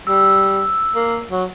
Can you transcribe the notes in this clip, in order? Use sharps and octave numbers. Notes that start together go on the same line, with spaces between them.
G3 E6
A#3
F#3